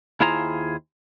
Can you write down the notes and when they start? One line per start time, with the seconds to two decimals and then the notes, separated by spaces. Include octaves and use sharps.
0.21 D#2 E4 F4 G#4 C5 A#5